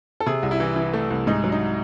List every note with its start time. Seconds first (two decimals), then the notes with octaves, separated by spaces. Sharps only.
0.20 A4
0.26 C3 G#4
0.43 C2
0.51 E4
0.60 E3
0.76 E3
0.93 A3
1.10 C2
1.27 G#2 D#4
1.44 F#3
1.52 D#4